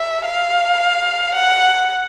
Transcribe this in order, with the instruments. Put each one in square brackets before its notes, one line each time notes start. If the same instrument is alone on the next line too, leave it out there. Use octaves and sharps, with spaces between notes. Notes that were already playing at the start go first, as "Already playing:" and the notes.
Already playing: [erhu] E5
F5
F#5